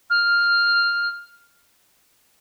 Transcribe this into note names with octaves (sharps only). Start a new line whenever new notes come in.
F6